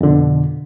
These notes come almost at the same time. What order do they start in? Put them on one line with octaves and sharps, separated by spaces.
F2 D3 B2